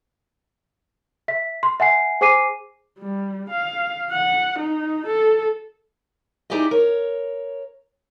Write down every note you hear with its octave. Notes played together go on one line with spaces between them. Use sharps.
E5 B6
C6
E5 F#5 G#5 C7
G#4 C5 G#5 D6 C7 D#7
G3
F5
F#5
D#4
A4
D#4 E4 G4 G#4 D5 D#5
A#4 C#5